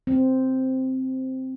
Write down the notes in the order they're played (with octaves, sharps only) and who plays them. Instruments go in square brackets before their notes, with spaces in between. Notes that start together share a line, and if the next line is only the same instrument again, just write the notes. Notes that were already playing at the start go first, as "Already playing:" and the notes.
[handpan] C4